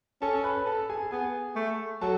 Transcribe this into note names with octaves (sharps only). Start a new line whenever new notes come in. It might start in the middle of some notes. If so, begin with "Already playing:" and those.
C#4 A4 A5
B4 B5
A4 A5
G#4 G#5
B3 G#4 G#5
A3
F#3 A4 A5